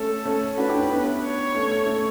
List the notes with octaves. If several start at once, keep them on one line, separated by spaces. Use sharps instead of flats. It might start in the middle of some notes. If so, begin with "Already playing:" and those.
Already playing: A3 C#4 A4
A3 C#4
D4 F#4 B4
E4 G4
C#4 E4
B3 D4
C#5
A3 C#4
A3
A3